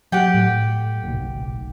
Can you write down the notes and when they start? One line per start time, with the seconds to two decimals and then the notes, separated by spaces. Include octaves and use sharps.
0.12 F#3 G4 F#5 G5
0.34 A2
1.04 F#1 B1